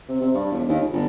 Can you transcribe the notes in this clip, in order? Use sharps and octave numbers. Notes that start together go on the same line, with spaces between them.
C3
C3
G2
E1
D#2
C#2
G1